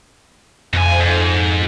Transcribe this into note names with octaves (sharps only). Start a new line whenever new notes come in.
F2 B2 G#5
G#2